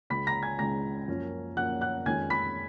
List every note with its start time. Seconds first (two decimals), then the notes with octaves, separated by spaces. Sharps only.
0.10 C#2 C#3 G#3 B5 B6
0.27 A#5 A#6
0.43 G#5 G#6
0.59 C#2 C#3 G#3 A#5 A#6
1.08 F#2 F3 A#3 C#4
1.57 F#2 F3 A#3 C#4 F#5 F#6
1.81 F#5 F#6
2.06 F2 D#3 G#3 C#4 G#5 G#6
2.30 B5 B6